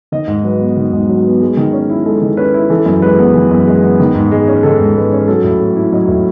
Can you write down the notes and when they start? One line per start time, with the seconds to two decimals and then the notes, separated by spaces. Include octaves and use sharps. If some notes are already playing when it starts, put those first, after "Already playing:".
0.12 D#3 D#5
0.28 G#2
0.44 F#3 B4
0.61 B3
0.76 D#3
0.93 G#2
1.09 F#3
1.25 B3
1.41 G#3
1.57 D#3
1.73 C#4
1.90 E4
2.05 G#3 A4
2.22 D#3
2.37 C#4 B4
2.54 E4
2.70 E3 A4
2.86 F#2
3.02 G#3 B4
3.19 B3
3.34 E3
3.51 F#2
3.67 G#3
3.83 B3
4.00 D#3
4.15 G#2
4.31 G#3
4.48 C#4
4.63 D#3 A4
4.80 G#2
4.95 G#3 B4
5.12 C#4
5.28 F#3 A4
5.44 A2
5.60 A3
5.76 E4
5.93 F#3 D#5
6.08 A2